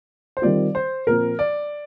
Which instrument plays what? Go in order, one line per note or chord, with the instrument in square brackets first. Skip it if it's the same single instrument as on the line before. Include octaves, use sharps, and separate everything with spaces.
[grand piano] C5
[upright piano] D#3 G3 C4 F4 [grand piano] D5
[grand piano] C5
[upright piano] A#2 F3 C4 [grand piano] A#4
[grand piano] D5